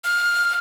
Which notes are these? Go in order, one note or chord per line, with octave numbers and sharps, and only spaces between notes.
F6